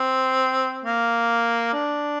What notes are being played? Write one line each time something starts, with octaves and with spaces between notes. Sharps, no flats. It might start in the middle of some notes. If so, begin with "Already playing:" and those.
Already playing: C4
A#3
D4